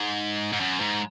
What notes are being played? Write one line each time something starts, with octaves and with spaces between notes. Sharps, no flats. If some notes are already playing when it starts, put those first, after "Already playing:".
Already playing: G#2
G#2
F#2
G#2